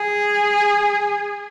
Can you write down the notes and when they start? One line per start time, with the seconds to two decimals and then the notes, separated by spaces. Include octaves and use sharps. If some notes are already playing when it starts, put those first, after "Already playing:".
Already playing: G#4